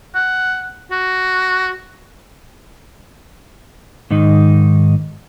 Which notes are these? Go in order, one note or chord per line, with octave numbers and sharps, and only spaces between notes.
F#5
F#4
G#2 D#3 D#4